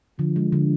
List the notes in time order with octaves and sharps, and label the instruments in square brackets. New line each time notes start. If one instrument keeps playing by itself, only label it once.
[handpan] D3 [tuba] F3
[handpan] G#3
D3